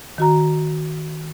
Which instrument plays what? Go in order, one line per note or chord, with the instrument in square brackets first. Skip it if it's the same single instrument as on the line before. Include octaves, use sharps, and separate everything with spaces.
[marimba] D#3 F#4 A#5